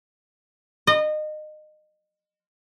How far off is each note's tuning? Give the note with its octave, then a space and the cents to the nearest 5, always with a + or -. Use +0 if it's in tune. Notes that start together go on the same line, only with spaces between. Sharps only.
D#5 -25